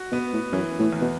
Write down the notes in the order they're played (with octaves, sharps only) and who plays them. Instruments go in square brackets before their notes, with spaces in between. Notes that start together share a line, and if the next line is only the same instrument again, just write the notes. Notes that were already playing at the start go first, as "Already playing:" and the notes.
Already playing: [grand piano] F#4
[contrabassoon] B2 [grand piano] B3
[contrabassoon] A2
[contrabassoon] F#2 [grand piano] E3
[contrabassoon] A2
[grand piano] E2
[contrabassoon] B2